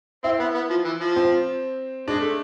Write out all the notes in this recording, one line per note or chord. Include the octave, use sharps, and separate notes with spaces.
C4 E4
B3
B3
F3
E3
F3
C4
G#3 D4
A3